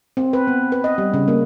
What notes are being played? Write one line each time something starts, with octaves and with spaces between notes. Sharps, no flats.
C4
B4
B3
B4
D#5
G3
C#3
A#3